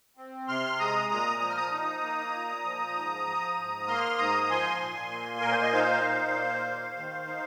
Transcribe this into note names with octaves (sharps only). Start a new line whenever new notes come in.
C4
C3 C6 F6
G#3 A#5 D#6
A#2 A#5 D#6
F3
F6
A#5 D#6
D#4
A#3
A#2
F3
G#2
F3
G#2
A#3 C6 F6
G#2 A#5 D#6
A#5
F3 G#5 C6
A#2
A#3
A#2 A#4
C5
D#5
D#4 C5 F5
A#2
A#3
D#2
D#3
D#4